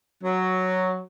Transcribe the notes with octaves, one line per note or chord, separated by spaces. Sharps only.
F#3